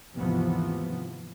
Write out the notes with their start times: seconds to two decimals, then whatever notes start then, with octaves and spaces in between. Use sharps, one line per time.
0.14 D#2 G#2 C3 E3 F3 B3